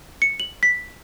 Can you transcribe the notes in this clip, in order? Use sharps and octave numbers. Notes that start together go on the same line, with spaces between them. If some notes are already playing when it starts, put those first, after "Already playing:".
C#7
F#7
B6